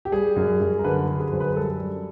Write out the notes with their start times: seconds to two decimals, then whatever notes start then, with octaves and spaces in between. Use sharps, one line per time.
0.05 G4
0.12 G3 G#4
0.36 F#2
0.61 F#2
0.79 A#4
0.84 D3 B4
1.08 D3
1.20 G#4
1.32 F#2 C5
1.40 B4
1.48 A#4
1.56 G3 A4
1.80 G3